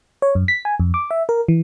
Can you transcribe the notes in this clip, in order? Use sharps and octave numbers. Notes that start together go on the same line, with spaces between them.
C#5
F#2
B6
G#5
F2
D6
E5
A#4
E3